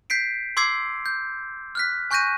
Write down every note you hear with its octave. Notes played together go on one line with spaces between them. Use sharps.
G6 B6 C7 D7
C6 D6 E6 G#6 C7
G6
F6 F#6 B6
G#5 C#6 F#6 G6 A#6 D#7